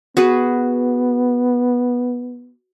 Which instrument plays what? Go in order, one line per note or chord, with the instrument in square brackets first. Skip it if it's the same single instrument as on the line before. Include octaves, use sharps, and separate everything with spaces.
[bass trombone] B3 [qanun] F#4 G#4 B4